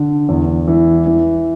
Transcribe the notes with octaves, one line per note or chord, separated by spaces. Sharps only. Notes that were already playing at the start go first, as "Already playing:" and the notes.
Already playing: D3
E2
E3
E3